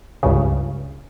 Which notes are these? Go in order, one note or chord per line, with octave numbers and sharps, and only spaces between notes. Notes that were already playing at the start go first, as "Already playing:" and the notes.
C#2 G2 C#3